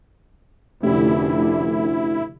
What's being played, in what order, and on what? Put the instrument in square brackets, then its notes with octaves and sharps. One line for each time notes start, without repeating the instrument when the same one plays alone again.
[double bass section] F1 D3 [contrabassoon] D2 [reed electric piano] A3 C#4 G4 [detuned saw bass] E4